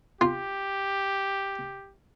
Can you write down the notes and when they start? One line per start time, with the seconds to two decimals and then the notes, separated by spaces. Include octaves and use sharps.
0.21 F4 G4